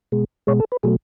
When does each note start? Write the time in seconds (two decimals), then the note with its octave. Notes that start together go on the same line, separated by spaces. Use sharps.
0.12 B2 G#3
0.47 B2 G#3 C#5
0.60 A4
0.72 B4
0.83 B2 F#3 A3 G#4